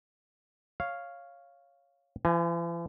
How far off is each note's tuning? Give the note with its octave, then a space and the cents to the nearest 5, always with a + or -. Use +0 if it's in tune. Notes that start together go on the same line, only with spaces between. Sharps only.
C#5 +0 F5 +0
E3 +45 G#5 +0